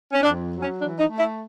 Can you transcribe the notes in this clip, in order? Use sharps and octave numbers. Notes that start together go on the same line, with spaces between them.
C#4
F2 D4
F#3
C#4
E3 D4
D#4
A3
E4